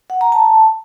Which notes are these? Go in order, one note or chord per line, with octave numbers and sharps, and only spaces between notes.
F#5
A#5
A5